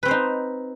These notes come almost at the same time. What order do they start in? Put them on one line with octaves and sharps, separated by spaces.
B4 C4 C5 D#4